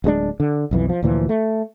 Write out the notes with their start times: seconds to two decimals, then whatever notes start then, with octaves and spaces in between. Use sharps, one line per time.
0.04 D1 G2 G#3 D4
0.40 D3
0.71 B1 F2 E3
0.89 F3
1.03 D2 A#2 E3 F3
1.29 A3